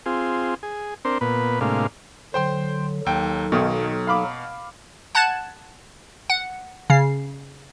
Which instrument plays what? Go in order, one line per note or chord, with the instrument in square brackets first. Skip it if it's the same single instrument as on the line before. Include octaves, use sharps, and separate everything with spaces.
[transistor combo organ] C4 F4 G#4
G#4
C4 D4 A#4 C5
A#2 B3 B4
A2 C3 G#3 A#3 D4 F5
[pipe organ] D3 F#3 [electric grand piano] C5 G5 C6
[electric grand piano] D#2 G5 [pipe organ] F#3 D#4 A4
[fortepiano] B1 D#3 [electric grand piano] B2
[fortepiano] F5 B5 D6
[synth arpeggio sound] F#5 A5 F#6 G#6 A6 E7
F#5
C#3 C7